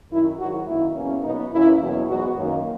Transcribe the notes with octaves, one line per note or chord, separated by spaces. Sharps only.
F#2 D#3 F#3 E4
G#2 D#3 F#3 F#4
F#2 D#3 A#3 E4
E2 B2 A#3 C#4
B2 F#3 B3 D#4
F#2 E3 A#3 C#4 E4
E2 B2 F#3
G#2 F#3 B3 F#4
F#2 D#3 A#3